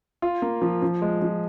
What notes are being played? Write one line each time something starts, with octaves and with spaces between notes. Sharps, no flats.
F4
A#3
F3
F3
G#3
F3